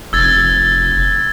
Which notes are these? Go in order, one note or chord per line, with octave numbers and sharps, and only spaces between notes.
F1 E6 G#6 A6